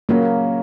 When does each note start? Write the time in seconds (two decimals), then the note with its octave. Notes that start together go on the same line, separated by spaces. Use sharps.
0.09 C#3 F#3 A#3 C#4 F#4